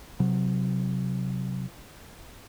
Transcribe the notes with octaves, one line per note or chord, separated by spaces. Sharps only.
C3 F#3